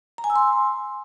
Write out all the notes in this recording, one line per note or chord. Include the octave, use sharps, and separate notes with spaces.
A#5
G#5
E6
C6